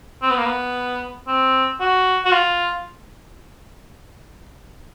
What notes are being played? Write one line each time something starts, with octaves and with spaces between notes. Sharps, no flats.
C4
B3
A#3
B3
C4
F#4
F#4
F4